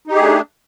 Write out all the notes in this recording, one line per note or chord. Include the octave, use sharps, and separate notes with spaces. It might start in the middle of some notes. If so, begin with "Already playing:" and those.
A3 D4 D#4 G4 G#4